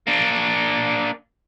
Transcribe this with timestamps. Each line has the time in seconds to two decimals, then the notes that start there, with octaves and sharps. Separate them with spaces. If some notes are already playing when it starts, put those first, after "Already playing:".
0.07 A#3 D4